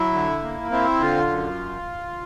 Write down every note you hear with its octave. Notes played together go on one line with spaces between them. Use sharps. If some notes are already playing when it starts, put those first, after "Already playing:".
Already playing: F#3 E4
D3
A#3
C4 E4
D3 F4
F#2